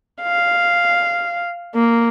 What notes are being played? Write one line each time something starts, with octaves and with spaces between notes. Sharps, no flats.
F5
A#3